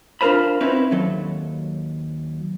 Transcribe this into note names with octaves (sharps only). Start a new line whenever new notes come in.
D4 F4 A4 A#4 C5 B5
C4 C#4 D#4 E4 B4
D#2 F#3 A4